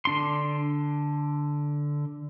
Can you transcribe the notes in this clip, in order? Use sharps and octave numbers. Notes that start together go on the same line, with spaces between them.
D3 D4 C6